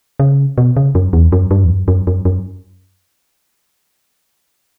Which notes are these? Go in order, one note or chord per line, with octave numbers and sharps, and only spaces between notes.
C#3
B2
C#3
F#2
E2
F#2
G2
E2
F#2
F#2
F#2
F#2